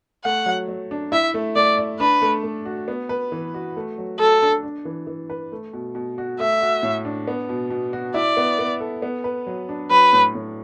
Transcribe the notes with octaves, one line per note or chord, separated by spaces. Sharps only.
A3 F#5
F#3
F#3
D4
E4 E5
A3
A3 D5
D5
D4 B4
A3
A3
F#4
B3
B4
E3
F#4
A3
F#3
F#3 A4
D4
D4
E3
E3
B4
A3
B2
B2
F#4
A3 E5
F#4
A2
D4
B3
B2
B2
F#4
E4 D5
B3
B3
A4
B3
B4
F#3
D4
F#3 B4
A2
A2